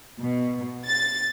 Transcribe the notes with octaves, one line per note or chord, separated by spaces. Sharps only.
B2
A6